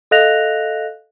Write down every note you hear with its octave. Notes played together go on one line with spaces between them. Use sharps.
A4 D#5 F5 F#6 A#6 F7